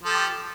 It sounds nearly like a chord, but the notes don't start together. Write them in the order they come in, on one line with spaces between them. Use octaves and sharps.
F3 A4 G4